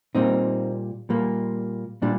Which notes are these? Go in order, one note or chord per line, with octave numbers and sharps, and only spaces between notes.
A#2 G3 A#3 C4 D#4
A#2 G3 A#3
A#2 G3 D4